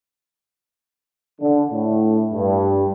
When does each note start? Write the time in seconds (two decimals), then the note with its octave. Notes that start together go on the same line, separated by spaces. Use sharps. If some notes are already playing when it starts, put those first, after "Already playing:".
1.41 D3
1.71 A2
2.33 G2